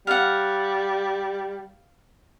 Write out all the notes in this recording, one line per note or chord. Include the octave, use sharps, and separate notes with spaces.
G3 F5 F#5